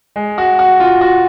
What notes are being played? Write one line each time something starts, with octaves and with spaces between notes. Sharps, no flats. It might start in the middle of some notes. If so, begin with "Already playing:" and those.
G#3
F#4
F#4
F4
F#4